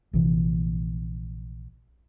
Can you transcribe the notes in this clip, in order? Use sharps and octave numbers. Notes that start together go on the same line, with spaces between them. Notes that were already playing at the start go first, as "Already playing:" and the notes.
A#1 C3 E3